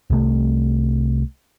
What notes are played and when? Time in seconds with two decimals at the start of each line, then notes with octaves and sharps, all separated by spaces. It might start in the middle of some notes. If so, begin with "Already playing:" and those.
0.10 C2 C3 A3